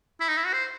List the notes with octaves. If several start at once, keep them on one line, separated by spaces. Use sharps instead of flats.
E4
D#4
E4
F#4
C5